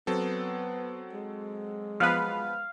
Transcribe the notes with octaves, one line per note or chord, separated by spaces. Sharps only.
F#3 B3 C4 A4
G#3
F3 B3 B4 F5